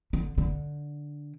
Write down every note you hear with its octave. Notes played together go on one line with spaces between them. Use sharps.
D3
D3